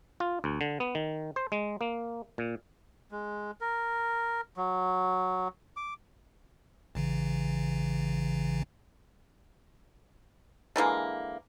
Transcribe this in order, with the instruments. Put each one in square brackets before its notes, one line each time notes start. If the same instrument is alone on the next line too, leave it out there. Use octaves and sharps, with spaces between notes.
[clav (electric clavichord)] F4
D2
D3
B3
D#3
C5
G#3
A#3
A#2
[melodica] G#3
A#4
F#3
D6
[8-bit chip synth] A1 C#3 E3
[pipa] D3 E3 G#3 A#3